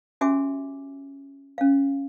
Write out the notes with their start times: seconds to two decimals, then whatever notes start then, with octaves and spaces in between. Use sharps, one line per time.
0.21 C#4 F#4 G4 E5 G#5 D6
1.58 C#4 F5